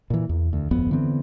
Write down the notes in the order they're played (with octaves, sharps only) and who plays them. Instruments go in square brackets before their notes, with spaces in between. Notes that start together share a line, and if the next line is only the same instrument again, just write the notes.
[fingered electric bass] A#2 E3
E2
D2
D1 G1 F2 B3
D3 E3 B3 C4